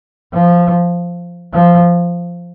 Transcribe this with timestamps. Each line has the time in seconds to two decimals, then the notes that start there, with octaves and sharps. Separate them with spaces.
0.33 F3
1.53 F3